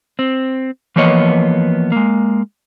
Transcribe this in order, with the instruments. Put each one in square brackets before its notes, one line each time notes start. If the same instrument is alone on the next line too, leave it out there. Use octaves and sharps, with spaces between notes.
[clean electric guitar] C4
E3 F3 A#3 B3 C#5 D#5
G#3 A#3